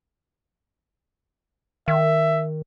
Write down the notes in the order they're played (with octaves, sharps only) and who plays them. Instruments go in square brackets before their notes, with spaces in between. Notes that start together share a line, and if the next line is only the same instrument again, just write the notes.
[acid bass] D#3 [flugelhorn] E5